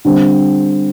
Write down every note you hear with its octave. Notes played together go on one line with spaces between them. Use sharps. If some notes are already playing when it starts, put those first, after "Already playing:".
D3 G3 C4